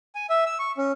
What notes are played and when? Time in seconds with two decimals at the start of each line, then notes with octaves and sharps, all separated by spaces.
0.15 G#5
0.30 E5
0.46 E6
0.59 C#6
0.78 C#4